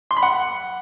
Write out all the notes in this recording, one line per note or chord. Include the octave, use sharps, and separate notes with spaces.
C6
B5
F#5